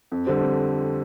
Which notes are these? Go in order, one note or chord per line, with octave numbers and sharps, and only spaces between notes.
F2
D3 G3 C4
F2